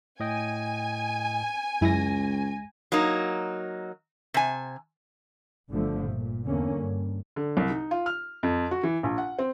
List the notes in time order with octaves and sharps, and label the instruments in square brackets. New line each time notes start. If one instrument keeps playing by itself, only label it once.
[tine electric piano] A2 D#5 G5 [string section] G#5
[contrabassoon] C#2 [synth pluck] F#2 E4 [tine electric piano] G#3 A#6
[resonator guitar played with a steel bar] F#3 A#3 D#4
C3 G#5
[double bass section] G1 D3 F3 A3
A#2
E2 D3 A#3 C#4
G2
[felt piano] D3
C2
D#4
F4
F6
F2
F#4
E3
A#1
F#5
C4